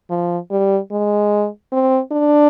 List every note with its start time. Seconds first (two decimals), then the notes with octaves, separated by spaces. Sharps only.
0.10 F3
0.51 G3
0.92 G#3
1.72 C4
2.12 D4